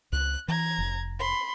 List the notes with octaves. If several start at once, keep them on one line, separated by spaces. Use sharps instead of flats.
C#2 F#6
E3 A#5 G#6
F1
B5 C6